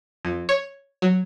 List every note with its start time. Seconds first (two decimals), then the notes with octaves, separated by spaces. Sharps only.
0.25 F2
0.49 C#5
1.02 F#3